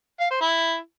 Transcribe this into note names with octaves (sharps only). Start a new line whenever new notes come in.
F5
C5
E4